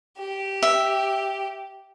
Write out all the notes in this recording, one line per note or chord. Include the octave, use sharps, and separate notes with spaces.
G4
E5